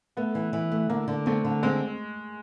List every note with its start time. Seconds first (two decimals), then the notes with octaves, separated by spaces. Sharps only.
0.17 A3 B3
0.35 E3
0.53 E3
0.72 A3
0.89 D3 A#3
1.08 D3
1.26 A3 C4
1.45 D3
1.63 G#3 C4